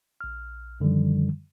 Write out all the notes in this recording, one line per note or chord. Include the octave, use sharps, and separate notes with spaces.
A#1 F6
F#2 D3 D#3 F3 G3